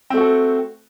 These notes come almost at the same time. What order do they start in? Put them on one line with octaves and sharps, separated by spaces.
C4 A3 F#4 A4